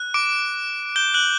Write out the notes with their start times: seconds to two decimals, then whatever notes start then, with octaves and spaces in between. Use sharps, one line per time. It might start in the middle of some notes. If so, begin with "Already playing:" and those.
Already playing: F#6
0.14 D6 D7
0.96 G6 G7
1.14 F#6 F#7